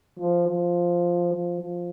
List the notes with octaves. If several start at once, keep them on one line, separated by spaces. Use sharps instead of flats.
F3
F3
F3
F3